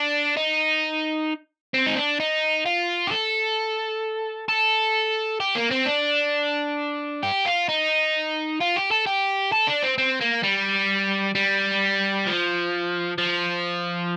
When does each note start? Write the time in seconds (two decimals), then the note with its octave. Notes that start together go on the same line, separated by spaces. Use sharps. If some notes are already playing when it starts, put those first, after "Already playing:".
Already playing: D4
0.37 D#4
1.74 C4
1.86 D#4
1.97 D4
2.20 D#4
2.66 F4
3.07 G4
3.11 A4
4.48 A4
5.40 G4
5.55 A#3
5.71 C4
5.86 D4
7.23 G4
7.46 F4
7.69 D#4
8.60 F4
8.76 G4
8.91 A4
9.06 G4
9.52 A4
9.67 D4
9.83 C4
9.98 C4
10.21 A#3
10.44 G3
11.35 G3
12.27 F3
13.18 F3